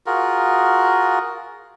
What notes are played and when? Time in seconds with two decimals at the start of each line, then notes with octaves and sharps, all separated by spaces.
0.06 F4 F#4 G#4 A#4